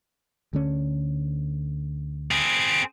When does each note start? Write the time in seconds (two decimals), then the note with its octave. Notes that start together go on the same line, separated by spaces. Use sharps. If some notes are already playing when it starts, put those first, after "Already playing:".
0.53 D2 D3 C#4
2.31 C4 G#4